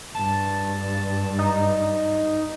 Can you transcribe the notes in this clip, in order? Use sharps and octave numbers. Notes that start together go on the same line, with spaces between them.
G2 A5
D#4